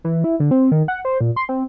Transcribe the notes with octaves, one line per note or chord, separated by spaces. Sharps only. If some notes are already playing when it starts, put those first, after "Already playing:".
E3
E4
D3
C4
D#3
F#5
C5
A#2
C6
C4